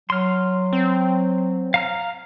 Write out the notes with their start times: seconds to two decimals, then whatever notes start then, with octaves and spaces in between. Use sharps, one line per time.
0.10 F#3 C6 F6
0.73 C4
1.74 F5 A#5 F6